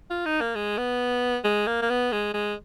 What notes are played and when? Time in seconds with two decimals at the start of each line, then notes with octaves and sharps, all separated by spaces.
0.10 F4
0.26 D#4
0.41 A#3
0.55 G#3
0.78 B3
1.44 G#3
1.67 A#3
1.82 A#3
1.90 B3
2.12 G#3
2.34 G#3